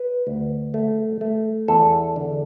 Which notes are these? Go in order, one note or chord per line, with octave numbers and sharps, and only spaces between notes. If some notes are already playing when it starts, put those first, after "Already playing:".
Already playing: B4
D2
A3
A3
E2 A4
D3